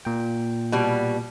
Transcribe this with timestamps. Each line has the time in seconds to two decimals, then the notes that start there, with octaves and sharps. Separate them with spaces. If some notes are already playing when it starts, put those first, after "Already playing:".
0.05 A#2 G5
0.72 B2 G3